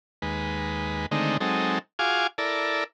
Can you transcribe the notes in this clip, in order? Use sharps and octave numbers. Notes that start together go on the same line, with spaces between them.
D#2 G#3 B4
D3 D#3 G#3 A3 C4 D#4
F#3 G#3 C4 D#4 A4
F4 F#4 G#4 F5 G#5 D6
E4 A4 A#4 D5